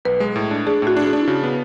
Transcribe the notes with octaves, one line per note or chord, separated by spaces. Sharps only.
B1 B4
G#3
A2
D4
D4 G#4
A2 F#4
D4
F#4
G#4
D4
E4
C#3 F#4
B3